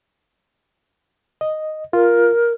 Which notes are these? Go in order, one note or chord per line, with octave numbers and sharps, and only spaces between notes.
D#5
F4 A#4